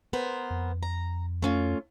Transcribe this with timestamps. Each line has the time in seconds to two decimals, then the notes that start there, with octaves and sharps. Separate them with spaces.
0.13 B3 A#4 C5
0.50 F2
0.83 A#5
1.42 A3 C#4 F4